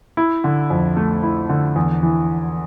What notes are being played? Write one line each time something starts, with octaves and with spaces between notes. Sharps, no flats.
E4
D3
F2
A3
E4
D3
E2
E3